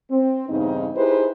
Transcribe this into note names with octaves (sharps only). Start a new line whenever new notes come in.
C4
E2 G2 C#3 C4 D#4
D#4 E4 G4 G#4 B4 C5